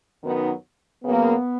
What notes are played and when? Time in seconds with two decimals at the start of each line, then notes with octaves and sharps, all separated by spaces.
0.23 F#2 D#3 F#3 B3 D#4
1.04 C#3 F#3 A#3 B3